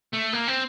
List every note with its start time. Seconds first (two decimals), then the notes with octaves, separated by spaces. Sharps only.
0.13 A3
0.33 A#3
0.48 C4